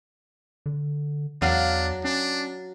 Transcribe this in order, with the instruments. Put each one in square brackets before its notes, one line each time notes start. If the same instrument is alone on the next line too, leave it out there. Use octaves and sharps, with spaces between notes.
[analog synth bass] D3
[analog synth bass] E2 [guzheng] F#3 F5 [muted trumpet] D4
[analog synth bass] C#4 [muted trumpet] D4